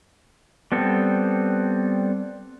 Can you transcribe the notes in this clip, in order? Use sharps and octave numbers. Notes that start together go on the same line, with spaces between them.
G3 B3 C4 A4